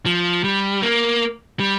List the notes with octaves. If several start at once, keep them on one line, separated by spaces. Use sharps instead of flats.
F3
G3
A#3
G3